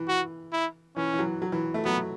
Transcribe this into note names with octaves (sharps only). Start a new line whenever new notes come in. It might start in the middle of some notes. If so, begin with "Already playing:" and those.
Already playing: E3
F#4
E4
E3 C#4
E3
F#3
F#3
E3
A3
F#3 B3